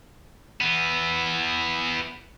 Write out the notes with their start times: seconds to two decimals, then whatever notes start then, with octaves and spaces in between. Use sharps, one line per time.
0.61 E3 B3